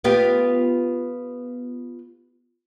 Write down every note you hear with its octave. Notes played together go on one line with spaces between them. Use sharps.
B3 F4 G4